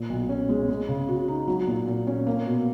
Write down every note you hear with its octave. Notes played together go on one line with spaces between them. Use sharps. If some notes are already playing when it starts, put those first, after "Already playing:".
Already playing: A#2
B1
C#4
G#3
G#3
C#3
F#4
D#4
F#3
A#2
A#2
C#4
A#3
B2